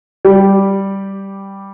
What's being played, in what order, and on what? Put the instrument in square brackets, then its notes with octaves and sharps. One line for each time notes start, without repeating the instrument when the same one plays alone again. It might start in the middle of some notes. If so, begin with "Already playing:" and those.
[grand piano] G3 G4